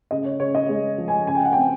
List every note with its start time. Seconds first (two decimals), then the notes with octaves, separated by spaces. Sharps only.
0.11 C#3 D#5
0.25 C#5
0.40 C#3 C#5
0.55 D#5
0.69 G#3
0.98 F3
1.08 G#5
1.27 C#3 G#5
1.35 G5
1.45 F#5
1.53 C4 G5